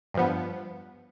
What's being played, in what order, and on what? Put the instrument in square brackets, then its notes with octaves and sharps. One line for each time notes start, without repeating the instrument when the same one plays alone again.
[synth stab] G2 F3 B3